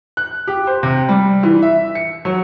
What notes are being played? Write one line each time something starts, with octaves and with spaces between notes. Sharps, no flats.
F#6
G4
C5
C3
G3
E3
E5
C#7
F#3